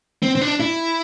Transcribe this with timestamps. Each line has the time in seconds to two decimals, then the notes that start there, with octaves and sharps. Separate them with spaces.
0.23 C4
0.35 C4
0.41 D4
0.60 E4